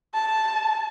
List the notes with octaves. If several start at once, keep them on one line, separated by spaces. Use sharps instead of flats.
A5